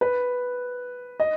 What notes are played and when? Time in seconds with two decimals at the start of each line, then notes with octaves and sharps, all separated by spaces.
0.01 B4
1.20 D#5